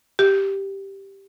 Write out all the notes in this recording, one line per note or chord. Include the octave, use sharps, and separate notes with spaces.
G4